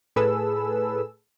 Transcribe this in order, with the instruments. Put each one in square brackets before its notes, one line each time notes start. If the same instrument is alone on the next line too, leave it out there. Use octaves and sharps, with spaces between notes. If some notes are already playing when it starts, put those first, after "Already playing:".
[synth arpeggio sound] A2 G#4 A4 B4 E6